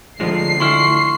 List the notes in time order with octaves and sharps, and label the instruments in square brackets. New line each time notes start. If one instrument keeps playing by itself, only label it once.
[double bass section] D3 A3 [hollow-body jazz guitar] F3 G#3 [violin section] C7
[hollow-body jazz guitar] D2 E4 [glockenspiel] C6 C#6 F6